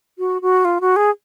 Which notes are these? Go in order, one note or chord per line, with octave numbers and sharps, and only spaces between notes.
F#4
F#4
F4
F#4
G#4